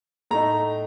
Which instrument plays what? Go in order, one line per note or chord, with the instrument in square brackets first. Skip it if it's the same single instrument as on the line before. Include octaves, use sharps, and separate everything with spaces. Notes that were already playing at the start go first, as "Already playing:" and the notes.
[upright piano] A2 A3 D#4 A#5